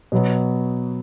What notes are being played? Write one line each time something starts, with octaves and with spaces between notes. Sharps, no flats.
B2 F#3 B3